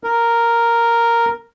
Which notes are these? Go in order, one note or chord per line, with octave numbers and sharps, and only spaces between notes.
A#4